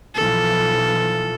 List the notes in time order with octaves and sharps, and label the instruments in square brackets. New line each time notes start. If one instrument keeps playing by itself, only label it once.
[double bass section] B1 E3 F3 [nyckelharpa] A4